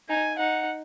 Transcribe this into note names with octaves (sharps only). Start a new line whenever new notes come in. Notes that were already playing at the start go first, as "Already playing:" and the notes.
D#4 G#5
D#4 F#5